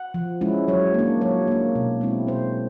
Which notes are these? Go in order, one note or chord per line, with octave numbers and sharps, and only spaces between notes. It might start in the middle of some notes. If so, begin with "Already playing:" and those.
Already playing: F#5
F3
G#3 C#4 E4
F#3 C#5
A#3 D4
F#3 C#5
A#3 D4
B2
G#3 C4 E4
B2 C5